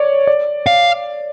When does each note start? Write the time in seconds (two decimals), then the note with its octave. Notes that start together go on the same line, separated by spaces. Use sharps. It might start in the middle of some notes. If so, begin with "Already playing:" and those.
Already playing: C#5 D5
0.27 D5
0.66 F5